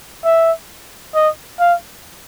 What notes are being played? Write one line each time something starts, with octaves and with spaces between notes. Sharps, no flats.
E5
D#5
F5